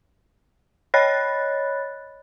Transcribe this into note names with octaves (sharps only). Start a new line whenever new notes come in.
C#5 D#5 B5 F#6 A6